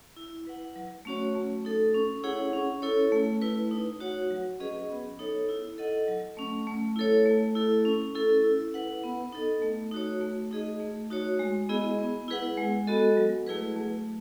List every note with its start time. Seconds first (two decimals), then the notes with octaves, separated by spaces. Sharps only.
0.16 E4
0.47 B4 F#5
0.76 F#3
1.05 A3 C#4 F#4 C#5
1.35 A3
1.65 D#4 A4
1.94 C#4
2.23 E4 G#4 C#5 F#5
2.53 C#4
2.82 E4 A4 C#5
3.12 A3
3.42 E4 B4
3.71 D#4
4.00 F#4 C#5 F#5
4.31 F#3
4.60 C#4 G#4 B4 D#5
4.90 B3
5.19 D#4 A4 C#5
5.49 E4
5.78 A4 D#5 F#5
6.08 F#3
6.37 A3 C#4
6.67 A3
6.96 E4 A4 C#5
7.26 A3
7.55 E4 A4
7.85 C#4
8.15 E4 A4
8.44 E4
8.74 B4 F#5
9.03 B3
9.33 D#4 A4 D#5
9.62 A3
9.91 D#4 F#4 C#5
10.21 A3
10.51 D#4 G#4 D#5
10.80 A3
11.10 D#4 F#4 C#5
11.39 G#3
11.69 B3 E4 G#4 D#5
11.99 B3
12.28 E4 G#4 B4 F#5
12.57 G#3
12.87 B3 F#4 A4 D#5
13.17 F#3
13.47 A3 E4 G#4 B4
13.76 A3